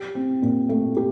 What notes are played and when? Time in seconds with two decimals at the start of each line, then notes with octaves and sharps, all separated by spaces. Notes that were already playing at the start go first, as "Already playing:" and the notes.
Already playing: G4
0.15 C4
0.42 A#2
0.69 A3
0.97 G4